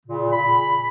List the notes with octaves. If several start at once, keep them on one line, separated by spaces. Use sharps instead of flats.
A#2 C#3
B5